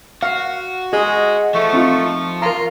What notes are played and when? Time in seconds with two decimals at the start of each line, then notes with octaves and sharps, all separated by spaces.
0.23 F#4 F5
0.93 G#3 G#4
1.54 F3 A3 C#6
1.73 C4 D#4 F4
2.42 F4 A#4 A#5